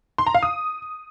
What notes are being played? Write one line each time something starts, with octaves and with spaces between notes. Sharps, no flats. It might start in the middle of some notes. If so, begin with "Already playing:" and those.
C6
A#5
F5
D#6